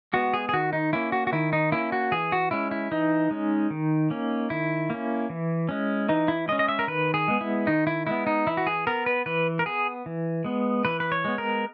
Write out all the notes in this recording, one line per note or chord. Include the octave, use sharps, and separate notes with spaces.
G#3 B3 F#4
G#4
G#4
D#3 F#4
D#4
A#3 C#4 E4
F#4
F#4
D#3 E4
D#4
A#3 C#4 E4
F#4
E3 G#4
F#4
G#3 C#4 E4
E4
E3 D#4
G#3 C#4
D#3
A#3 C#4
D#3 E4
A#3 C#4
E3
G#3 C#4
E3 D#4
E4
G#3 C#4 D#5
D#5
E5
A#4
D#3 B4
G#4
G#3 B3
E4
D#3 D#4
E4
G#3 B3 E4
D#4
E3 E4
F#4
G#4
B3 A#4
B4
E3 B4
A#4
B3 G#4
E3
G#3 B3
E3 B4
B4
C#5
G#3 B3
A#4